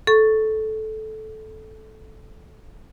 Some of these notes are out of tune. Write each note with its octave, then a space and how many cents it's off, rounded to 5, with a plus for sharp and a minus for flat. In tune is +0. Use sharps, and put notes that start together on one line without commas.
A4 -15 C#6 +0